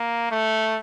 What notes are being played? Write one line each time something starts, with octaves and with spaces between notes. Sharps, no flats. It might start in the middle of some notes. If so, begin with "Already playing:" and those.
Already playing: A#3
A3